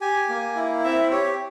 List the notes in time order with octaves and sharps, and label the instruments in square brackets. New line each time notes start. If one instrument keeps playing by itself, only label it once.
[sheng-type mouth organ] G4 G#5
A#3
E4
C4 E5
G4 C#5